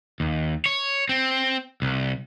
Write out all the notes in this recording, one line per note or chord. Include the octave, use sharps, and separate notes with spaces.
D#2
C#5
C4
C2